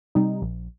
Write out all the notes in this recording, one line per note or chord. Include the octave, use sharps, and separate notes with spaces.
C3 G3 D#4
A#1